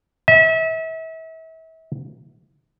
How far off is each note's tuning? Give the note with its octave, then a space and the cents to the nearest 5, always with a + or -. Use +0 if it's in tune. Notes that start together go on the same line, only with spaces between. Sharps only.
E5 -35